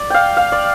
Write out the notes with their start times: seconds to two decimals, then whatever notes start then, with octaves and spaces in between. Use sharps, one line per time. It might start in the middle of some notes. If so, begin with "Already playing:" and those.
Already playing: D5
0.10 F5 G5
0.37 F5
0.52 D5